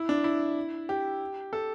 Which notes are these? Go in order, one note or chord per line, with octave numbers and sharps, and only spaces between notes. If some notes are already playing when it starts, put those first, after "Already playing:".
Already playing: E4
D4
E4
G4
A4